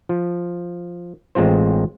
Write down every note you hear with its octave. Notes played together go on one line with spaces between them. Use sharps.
F3
A1 G#3 C4 F4 C5